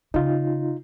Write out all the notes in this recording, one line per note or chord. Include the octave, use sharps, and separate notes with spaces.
C#3 D#4 F4